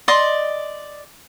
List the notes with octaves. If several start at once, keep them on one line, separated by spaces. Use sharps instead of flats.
D5 D#5 C6